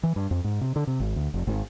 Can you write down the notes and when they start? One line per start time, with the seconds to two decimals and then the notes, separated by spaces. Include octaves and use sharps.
0.03 E3
0.16 G2
0.31 F2
0.44 G#2
0.61 C3
0.76 D3
0.87 C3
1.00 G#1
1.16 D2
1.34 F1
1.47 G#1